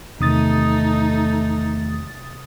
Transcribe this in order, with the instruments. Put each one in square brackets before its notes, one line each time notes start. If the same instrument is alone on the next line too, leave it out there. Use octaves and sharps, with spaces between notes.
[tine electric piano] E2 D#3 [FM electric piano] C3 D#6 A6 [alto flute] A3 [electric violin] D#4